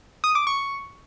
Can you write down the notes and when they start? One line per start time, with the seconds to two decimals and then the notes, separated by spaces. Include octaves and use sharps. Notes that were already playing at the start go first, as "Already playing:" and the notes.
0.24 D#6
0.35 D6
0.47 C#6